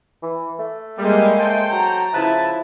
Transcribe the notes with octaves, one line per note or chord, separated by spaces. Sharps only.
E3
A3
G3 G#3 A#3
A4 C5 G5
F#3 A#5
C#3 F3 E4 B4 A5